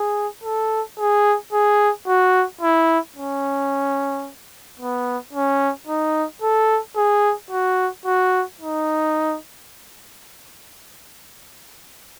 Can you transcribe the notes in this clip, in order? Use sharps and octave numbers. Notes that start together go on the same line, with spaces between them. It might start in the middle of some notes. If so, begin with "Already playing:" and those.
Already playing: G#4
A4
G#4
G#4
F#4
E4
C#4
B3
C#4
D#4
A4
G#4
F#4
F#4
D#4